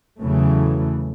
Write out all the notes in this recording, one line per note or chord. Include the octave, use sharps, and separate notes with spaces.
E2 C#3 E3 F#3 A3